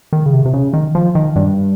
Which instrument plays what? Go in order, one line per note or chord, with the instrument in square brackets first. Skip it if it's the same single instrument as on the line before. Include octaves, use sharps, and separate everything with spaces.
[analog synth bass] D#3
C#3
C3
C3
C#3
D#3
F3
D#3
G2